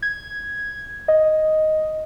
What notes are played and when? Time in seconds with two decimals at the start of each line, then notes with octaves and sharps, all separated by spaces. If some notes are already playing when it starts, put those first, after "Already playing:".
0.02 G#6
1.08 D#5